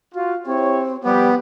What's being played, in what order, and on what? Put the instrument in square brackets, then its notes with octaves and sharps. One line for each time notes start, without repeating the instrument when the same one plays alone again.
[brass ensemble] F4 [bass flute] F#4
[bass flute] C4 [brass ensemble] E4 G4 C#5
[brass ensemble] F3 G4 [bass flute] G3 [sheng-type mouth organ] B3